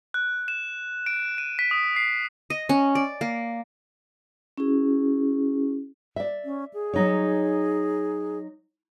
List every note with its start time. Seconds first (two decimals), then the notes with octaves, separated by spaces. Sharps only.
0.14 F#6
0.48 E7
1.06 D7
1.38 D#7
1.59 B6
1.71 D#6
1.96 C7
2.50 D#5
2.69 C#4
2.95 D5
3.21 A#3
4.57 C#4 E4 F#4 G#4
6.16 D5 E5
6.45 C#4
6.74 G#4
6.94 F#3 D#4 C#5